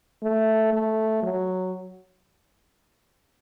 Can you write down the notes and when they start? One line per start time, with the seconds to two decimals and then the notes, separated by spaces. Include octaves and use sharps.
0.23 A3
0.73 A3
1.23 F#3